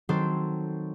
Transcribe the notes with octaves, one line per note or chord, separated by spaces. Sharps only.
D#3 F#3 C4 A4 C5